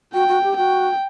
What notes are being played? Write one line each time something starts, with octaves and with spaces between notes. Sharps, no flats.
F#4 G5
F#4
G4
F#4 G5